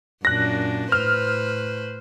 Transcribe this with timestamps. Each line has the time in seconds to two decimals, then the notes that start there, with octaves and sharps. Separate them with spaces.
0.25 F#2 A#2 D4 F#6 A#6
0.92 A2 B4 C5 F6